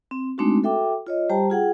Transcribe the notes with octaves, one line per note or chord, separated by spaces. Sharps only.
C4
G#3 A3 C4 D4 D#4 F#4
F#4 A4 E5 G5 D6
F4 C#5 D#5
G3 G4 C5 G5 A5 A#5
F4 G#4 F#5 G5